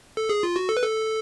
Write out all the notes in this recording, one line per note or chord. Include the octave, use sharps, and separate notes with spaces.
A4
G#4
F4
F#4
A4
B4
A4